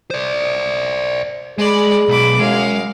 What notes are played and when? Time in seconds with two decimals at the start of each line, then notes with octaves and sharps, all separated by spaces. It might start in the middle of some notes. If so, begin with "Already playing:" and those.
0.11 C5 D5
1.58 G#3 G#4 D5 B5
2.08 B1 B5 D6
2.39 F#2 G#3 F5